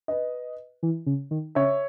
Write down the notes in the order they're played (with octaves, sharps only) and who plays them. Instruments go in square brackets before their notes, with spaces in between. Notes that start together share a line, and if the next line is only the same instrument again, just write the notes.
[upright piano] B4 D#5
[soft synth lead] E3
C#3
D#3
[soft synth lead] C#3 [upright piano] C#5 E5